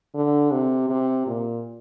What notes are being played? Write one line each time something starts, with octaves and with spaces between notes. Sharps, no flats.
D3
C3
C3
A#2